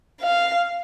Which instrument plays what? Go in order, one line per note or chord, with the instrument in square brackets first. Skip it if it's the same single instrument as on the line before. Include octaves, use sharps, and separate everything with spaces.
[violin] F5